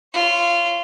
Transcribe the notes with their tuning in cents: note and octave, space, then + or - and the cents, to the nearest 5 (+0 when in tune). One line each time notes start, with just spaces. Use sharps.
F4 -20 C#5 -10